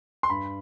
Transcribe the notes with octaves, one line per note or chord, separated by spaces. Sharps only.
C6
G2 B5